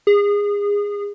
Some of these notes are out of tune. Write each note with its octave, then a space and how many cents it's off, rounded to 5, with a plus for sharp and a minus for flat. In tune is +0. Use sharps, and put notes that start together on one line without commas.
G#4 -25